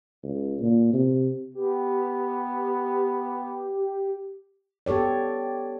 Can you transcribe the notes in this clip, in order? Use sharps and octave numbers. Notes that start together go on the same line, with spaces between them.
C#2
A#2
C3
B3 G4
B3 G4 A4 C#5 D5